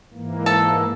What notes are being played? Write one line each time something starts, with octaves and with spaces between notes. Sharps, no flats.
G#2 E3 A#3
A4